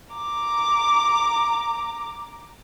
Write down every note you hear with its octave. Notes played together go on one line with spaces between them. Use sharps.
A#5 D6